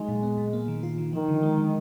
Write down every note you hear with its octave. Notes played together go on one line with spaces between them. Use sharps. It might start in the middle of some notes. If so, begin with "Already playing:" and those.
Already playing: F#3 G#3 D#4
A#2
B3
A#2
A#3
D#3
F4
D#3
D#3 F3
D3
G#3
D3